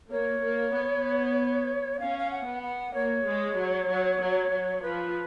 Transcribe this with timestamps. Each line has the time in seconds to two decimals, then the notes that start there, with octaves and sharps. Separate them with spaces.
0.10 A#3 C#5
0.42 A#3
0.73 B3
2.00 C#4 F5
2.19 F5
2.31 F#5
2.46 B3
2.63 F#5
2.94 A#3 C#5
3.26 G#3
3.57 F#3
3.89 F#3
4.20 F#3
4.51 F#3
4.82 F3 B4